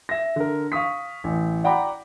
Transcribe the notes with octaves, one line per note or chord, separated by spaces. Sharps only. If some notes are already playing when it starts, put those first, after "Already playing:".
E5 A#6
D3 A#4
F5 C#6 D#6 B6
A1
D5 F#5 G5 A#5 B5 D6